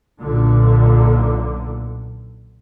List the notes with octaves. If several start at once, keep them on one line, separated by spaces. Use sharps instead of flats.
B1 A#2 D3